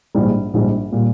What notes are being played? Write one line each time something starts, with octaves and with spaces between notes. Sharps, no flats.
A#1 G#2 G3
A#1 G#2 G3
A#2 G3